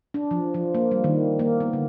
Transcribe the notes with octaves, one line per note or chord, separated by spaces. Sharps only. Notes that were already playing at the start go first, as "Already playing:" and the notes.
D4
F3
F3
A#3
G3
D#3
A#3
B3
D3